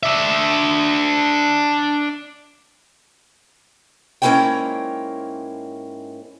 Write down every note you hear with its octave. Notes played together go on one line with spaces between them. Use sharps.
D4 E5
G#2 A#3 C#4 E4 C#5 G5